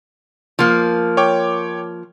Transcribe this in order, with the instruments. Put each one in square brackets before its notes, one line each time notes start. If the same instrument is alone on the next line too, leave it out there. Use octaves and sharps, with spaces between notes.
[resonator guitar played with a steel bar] F3 A#3
[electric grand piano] C#5 G5 D6